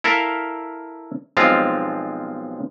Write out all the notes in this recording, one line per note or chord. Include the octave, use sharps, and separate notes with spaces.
E4 A4 A#4 E5 F5
B1 F3 G#3 C4 F4 F5